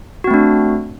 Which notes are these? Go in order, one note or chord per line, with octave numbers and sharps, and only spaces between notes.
A3 C4 D4 F#4